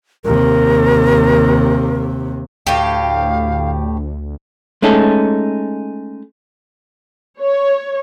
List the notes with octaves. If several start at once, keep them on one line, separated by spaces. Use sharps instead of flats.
D#2 C3 A#4
D2 A2 G4 F5
G#3 A3 C#4 D#4 A4
C#5